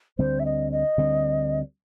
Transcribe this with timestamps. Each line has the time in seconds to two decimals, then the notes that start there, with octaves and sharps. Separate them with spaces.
0.18 D2 D3 G3 C4 C5
0.39 E5
0.45 D#5
0.72 D#5
0.98 D2 D3 G3 C4